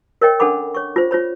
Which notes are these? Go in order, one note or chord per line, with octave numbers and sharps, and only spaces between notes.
A#4 C#5 D#5 G5
C#4 D4 A4 F#5 B5 D6
C#5 C#6
F4 C5
F4 C5 C#5 B5